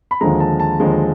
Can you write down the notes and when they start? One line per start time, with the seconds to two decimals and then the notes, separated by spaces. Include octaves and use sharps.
0.11 B5
0.21 D#2 D3 F3 G#3 A#5
0.40 A5
0.60 A5
0.80 D#2 D3 F3 G#3